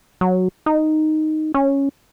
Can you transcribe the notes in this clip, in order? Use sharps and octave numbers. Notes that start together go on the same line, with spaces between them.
F#3
D#4
C#4